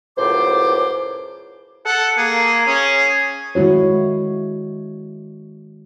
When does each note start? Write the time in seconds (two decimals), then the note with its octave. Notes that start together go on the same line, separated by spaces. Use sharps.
0.17 C#2 F#2 A2 C5 D6
1.86 A4 F#5
2.18 A#3 G#4
2.67 C#4 G#4
3.55 D#3 G#3 E4 F#4 C#5